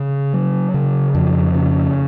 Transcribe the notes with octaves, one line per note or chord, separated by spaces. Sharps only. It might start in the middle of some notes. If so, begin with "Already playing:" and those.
Already playing: C#3
F#3
C#3
F2
C#3